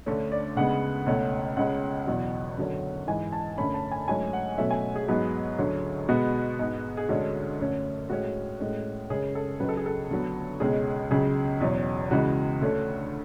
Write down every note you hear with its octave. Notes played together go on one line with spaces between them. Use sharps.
D2 D3 A3 C#4
D5
D2 C#3 G#3 B3 F#5
C#2 B2 A3 C#4
C#2 C#3 G#3 C#4 F#5
E2 B2 F#3
F#2 D3 F#3 C#4
G#2 E3 G#3 G#5
A5
F#2 D3 A3 C#4 B5
A5
G#5
G#2 F#3 A3 C#4 G#5
F#5
B2 F#3 A3 C#4 E5
G#5
G#4
G#2 F#3 B3
D2 D3 F#3 C#4
B2 G#3 B3 F#4
G#2 G#3 B3
G#4
D2 D3 G#3 C#4 F#4
F#2 D3 A3 C#4
A2 G#3 C#4 F#4
A2 G#3 C#4
F#2 C#3 G#3 C#4 G#4
A4
C#2 C#3 F#3 B4
A4
G#4
A4
D2 D3 F#3 B3
C#2 B2 G#3 C#4 G#4
C#2 C#3 F#3 G#4
E2 B2 F#3 C#4
C#2 C#3 E3 G#3 F#4
D2 D3 A3 C#4